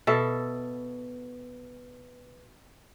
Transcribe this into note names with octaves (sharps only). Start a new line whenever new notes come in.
B2 A4 E5